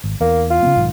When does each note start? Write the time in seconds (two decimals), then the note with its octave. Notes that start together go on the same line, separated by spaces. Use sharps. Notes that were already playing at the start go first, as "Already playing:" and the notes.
0.04 G#1
0.20 E2 A#3
0.50 F4
0.63 C#3 G#3 B3
0.74 B1 G#2 D#3